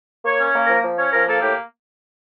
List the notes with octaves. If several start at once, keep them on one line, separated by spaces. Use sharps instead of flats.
A#3 C#5
C#4 C#5
A#3
F3 A#4
F3
C#4 C#5
F3 A#4
A#3 A4
A2 G4